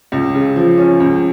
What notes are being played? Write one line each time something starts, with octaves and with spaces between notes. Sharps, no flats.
C#2
C#3
F3
C#4
C#2